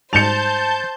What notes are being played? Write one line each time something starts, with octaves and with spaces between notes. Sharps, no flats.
G#2 G3 C5 A5 G6 C#7 F7